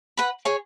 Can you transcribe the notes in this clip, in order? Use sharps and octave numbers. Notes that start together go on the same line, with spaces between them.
B4 F#5 B5
G#4 C#5 G#5